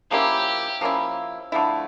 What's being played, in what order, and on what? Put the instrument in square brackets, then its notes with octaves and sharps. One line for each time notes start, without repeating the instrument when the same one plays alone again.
[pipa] F3 A#3 C#4 E4 [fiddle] G4
[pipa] F3 A#3 C#4 E4
D3 F3 A3 E4